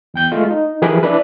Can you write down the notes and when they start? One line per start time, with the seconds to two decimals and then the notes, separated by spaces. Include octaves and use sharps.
0.14 E2 G5 G6
0.32 G#3 A3 F4
0.51 D#4
0.82 E3 F3 G4 G#4 A#4 B4
1.03 D4 E4 B4